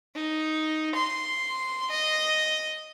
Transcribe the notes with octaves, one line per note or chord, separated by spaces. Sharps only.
D#4
C6
D#5